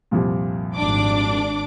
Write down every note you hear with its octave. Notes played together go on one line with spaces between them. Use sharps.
C2 F2 A#2
G#1 D4 D6